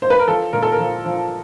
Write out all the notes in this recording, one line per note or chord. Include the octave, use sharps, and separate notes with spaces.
C5
B4
A#4
F3 A4
A#2 A#4
A4
A#4
F3
F3